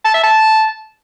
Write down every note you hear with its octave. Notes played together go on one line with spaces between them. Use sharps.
A5
E5
A5